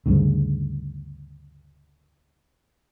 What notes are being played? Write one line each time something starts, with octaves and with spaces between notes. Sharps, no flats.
D2 G2 C#3